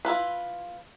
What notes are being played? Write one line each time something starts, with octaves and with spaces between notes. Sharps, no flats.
E4 F4 B4